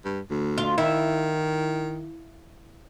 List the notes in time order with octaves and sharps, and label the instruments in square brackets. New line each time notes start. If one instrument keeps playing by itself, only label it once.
[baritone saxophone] G2
D2
[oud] F4
[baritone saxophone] D#3 [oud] E4